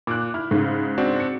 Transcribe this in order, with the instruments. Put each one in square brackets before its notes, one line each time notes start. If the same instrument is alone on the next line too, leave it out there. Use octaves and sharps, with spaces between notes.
[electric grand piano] A#2 [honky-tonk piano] D6 F#6
[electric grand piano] E4 [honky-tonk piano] F6
[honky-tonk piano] G#2 C#3
[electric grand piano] C4 D4 F#4
[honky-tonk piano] C#7